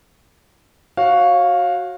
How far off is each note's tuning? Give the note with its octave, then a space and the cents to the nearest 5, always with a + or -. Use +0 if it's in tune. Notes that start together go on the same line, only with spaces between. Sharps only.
F#4 +0 C#5 -30 F5 +5